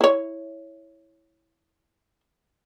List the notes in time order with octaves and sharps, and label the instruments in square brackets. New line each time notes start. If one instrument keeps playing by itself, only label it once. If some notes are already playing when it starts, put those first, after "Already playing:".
[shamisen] E4 C#5